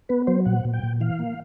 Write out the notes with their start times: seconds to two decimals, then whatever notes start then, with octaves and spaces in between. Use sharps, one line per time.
0.09 B3 B4
0.27 F#3 C5
0.45 A#2 F#5
0.65 A#2
0.73 G5
0.83 A#2
1.01 E3 F5
1.19 A#3